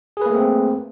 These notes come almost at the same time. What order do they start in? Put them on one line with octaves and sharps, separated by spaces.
G#4 B4 A#3 A3 C4